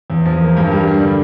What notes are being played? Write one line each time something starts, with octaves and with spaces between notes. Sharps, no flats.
E2
F3
A#3
G2
G3
D4
D3